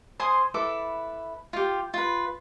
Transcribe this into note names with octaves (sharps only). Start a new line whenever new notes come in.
C5 G#5 C6 D#6
E4 A4 B4 D6
F4 G4
F4 B4